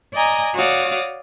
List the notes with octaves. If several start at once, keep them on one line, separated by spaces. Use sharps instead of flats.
D5 D#5 G#5 A#5
F#4 C#5 D5 F5 D#6